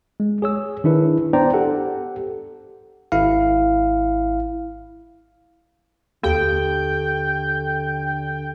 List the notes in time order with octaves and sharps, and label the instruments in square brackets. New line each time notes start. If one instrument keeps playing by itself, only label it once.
[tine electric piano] G#3
G#4 C#5 E6
D#3 D4 E4 B4
B3 D4 C5 D5 G5 A#5
G4 A4 F#5
G#1 E4 F5
[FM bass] D#2 [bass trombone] D3 [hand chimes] G4 A4 [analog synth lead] G5